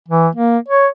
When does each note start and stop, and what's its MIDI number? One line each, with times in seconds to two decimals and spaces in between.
0.09 0.28 52
0.35 0.58 58
0.68 0.88 73